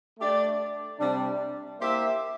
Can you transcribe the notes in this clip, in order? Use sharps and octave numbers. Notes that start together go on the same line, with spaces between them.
A3 D4 G4 D5
C3 G3 D4
A#3 E4 G4 C5 E5